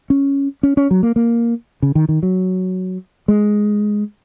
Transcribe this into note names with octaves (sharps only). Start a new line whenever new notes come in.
C#4
C#4
C#4
F#3
A#3
A#3
C#3
D#3
D#3
F#3
G#3